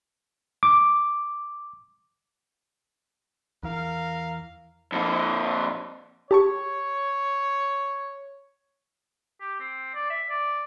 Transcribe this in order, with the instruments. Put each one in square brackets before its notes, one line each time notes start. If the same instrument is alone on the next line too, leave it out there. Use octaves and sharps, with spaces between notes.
[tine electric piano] D6
[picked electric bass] E2 E3 [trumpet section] A#4 F5
[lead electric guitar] F2 A#2
[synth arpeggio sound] G4 A5 C#6 [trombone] C#5
[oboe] G4
C4
D5
E5
D5